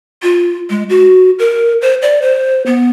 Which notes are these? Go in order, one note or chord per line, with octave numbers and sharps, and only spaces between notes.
F4
G#3
F#4
A#4
C5
D5
C5
B3